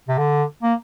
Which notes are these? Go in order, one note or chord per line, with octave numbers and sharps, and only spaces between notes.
C3
D3
A#3